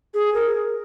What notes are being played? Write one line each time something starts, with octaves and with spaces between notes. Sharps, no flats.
G#4
A#4